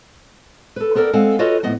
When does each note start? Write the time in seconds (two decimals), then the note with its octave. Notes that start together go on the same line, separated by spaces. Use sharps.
0.76 A4 B4
0.95 B3 A4 A#4 C5 D5 G5
1.13 G#3 C4 A4 F5 F#5 G#5
1.39 F4 F#4 A4 B4 C#5 D#5
1.63 F2 A2 B3 D#5 F#5